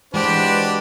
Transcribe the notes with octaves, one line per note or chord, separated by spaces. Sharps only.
E3 G#3 D4 F#4 G4 B4 C5 D5